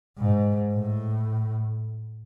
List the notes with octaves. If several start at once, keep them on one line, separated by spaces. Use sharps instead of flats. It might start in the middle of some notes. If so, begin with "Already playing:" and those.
G#2
A2